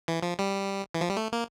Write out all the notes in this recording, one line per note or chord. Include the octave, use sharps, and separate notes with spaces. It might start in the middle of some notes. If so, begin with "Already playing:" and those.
E3
F3
G3
E3
F3
G3
A3
A#3